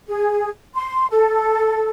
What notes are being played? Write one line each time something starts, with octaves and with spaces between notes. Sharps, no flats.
G#4
C6
A4